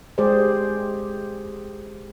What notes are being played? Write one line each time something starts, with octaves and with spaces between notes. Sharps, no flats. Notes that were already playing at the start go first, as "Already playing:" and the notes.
G#3 G4 G#4 C5 D5